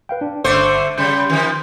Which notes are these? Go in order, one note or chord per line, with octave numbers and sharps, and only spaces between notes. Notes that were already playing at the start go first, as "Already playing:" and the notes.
B4 F5 G5
D4
G1 D3 A3 C5 D6 C#7
C#3 G3 C6 G6
D#3 F3